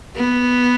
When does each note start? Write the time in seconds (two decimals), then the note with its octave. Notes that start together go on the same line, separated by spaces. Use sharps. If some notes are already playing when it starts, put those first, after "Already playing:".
0.16 B3